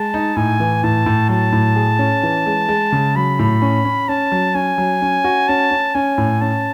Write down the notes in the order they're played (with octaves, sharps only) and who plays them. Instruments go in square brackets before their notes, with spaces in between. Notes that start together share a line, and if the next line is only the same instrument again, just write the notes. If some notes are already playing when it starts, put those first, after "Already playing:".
Already playing: [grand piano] G#3 [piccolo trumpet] A5
[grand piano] D#4
[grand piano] A2 [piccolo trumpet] G#5
[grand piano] E3
[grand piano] A2 [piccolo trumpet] A5
[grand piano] A2
[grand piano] F#3 [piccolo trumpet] A5
[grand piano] A2
G#4
C#4
E3
G#3
G#3
C#3
[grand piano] F#3 [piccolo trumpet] B5
[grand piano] A2
C#4
C#4
[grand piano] C#4 [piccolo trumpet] A5
[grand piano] F#3
[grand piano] C#4 [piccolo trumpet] G#5
[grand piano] F#3
C#4
F#4
[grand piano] C#4 [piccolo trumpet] A5
[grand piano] C#4
[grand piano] C#4 [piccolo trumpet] G#5
[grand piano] A2
[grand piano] C#4 [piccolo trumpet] A5